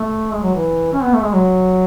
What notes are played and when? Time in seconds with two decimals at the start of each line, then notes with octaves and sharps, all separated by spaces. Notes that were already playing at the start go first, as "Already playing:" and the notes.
Already playing: A3
0.33 G#3
0.43 F#3
0.55 E3
0.93 C#4
1.03 B3
1.14 A3
1.24 G#3
1.34 F#3